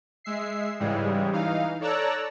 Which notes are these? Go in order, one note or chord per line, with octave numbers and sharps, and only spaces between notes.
G#3 E5 C7
G#2 C#3 E3 G3 G#3
E3 D#4 F5
A4 C#5 D5 A#5 E6 F#6